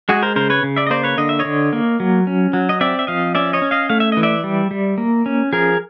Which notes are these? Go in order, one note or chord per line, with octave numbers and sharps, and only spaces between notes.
G#3 F#4 G#4
A#4 C5
C#3 A#4 C5
B4 C#5
C#3
D5 E5
D#5
A#3 C5 D5
B4 C#5
D3 D#5
E5
C#5 D#5
D3
A#3
F#3
C#4
F#3
D#5
C4 D5 E5
E5
F3 D#5 F5
C#4 D5 E5
C#5 D#5
C#4
D#5 F5
A3 F5
E5
E3 D#5
D5 E5
G3
G3
A#3
C#4
F3 G#4 A#4